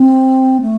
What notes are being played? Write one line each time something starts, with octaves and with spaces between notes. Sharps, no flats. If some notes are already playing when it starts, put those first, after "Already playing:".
Already playing: C4
A3